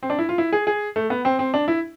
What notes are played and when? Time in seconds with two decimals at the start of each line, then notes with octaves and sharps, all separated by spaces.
0.03 C4
0.10 D4
0.19 E4
0.29 F4
0.38 E4
0.53 G#4
0.67 G#4
0.96 A3
1.10 B3
1.25 C4
1.39 C4
1.54 D4
1.68 E4